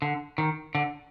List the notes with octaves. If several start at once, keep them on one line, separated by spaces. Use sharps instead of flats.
D3
D#3
D3